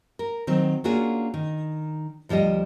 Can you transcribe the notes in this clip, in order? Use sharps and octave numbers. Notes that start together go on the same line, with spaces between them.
A#4
D#3 F#3 C4
A#3 C#4 D4 F4 F#4 G#4
D#3
D2 F3 G3 G4 D#5